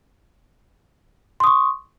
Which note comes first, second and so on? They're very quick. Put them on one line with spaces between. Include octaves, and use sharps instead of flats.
C6 D#6 C#6